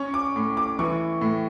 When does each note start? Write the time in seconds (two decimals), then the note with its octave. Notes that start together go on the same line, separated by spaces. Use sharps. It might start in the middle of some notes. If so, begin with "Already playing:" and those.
Already playing: C#4 C#6
0.14 D6
0.36 A2
0.57 D6
0.79 E3 C#6
1.21 A2